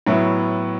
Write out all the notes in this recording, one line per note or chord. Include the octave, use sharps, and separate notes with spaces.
A2 F#3 B3 E4